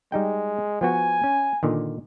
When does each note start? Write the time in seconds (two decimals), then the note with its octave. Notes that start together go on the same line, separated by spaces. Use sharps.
0.12 G3 G#3 D#4 G5
0.81 F3 B3 F#4 G#5
1.24 C#4
1.63 A#2 D3 D#3